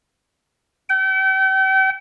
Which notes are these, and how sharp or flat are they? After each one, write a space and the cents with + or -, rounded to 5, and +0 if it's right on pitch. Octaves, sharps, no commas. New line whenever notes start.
G5 -40